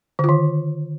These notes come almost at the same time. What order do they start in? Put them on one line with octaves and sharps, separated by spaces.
D3 F4 D#3